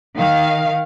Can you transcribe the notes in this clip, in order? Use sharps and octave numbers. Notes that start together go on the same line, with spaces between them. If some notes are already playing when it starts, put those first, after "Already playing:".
D#3 F5